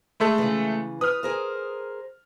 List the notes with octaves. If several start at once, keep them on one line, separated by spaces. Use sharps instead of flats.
G#3 A3 A4
C#3 E3
B4 D#6 F6
G#4 A#4 C5